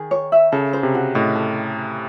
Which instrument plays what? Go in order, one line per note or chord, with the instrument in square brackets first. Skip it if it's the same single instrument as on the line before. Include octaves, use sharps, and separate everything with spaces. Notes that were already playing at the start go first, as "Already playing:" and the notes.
Already playing: [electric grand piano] D#3 [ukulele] G#4
[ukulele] C#5
E5
[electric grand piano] C#3 [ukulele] A4
[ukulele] C5
[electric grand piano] C3
[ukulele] F#4
[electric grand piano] A2 [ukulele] D#5
[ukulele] A4